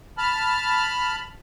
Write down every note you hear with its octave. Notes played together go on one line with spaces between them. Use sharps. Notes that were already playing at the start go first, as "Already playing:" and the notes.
A5 B5 F6